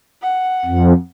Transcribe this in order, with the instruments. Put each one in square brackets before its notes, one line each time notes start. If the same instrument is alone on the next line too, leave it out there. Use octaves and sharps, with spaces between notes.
[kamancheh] F#5
[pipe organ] F2